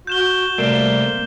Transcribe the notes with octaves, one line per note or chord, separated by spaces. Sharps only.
F#4 G6 E7 G7
C3 G3 A3 A#3 C4 A#4 D5